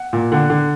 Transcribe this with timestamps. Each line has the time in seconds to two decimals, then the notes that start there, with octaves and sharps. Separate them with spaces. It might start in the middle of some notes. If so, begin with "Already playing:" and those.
Already playing: F#5
0.13 A#2
0.32 D3 F#5
0.50 D3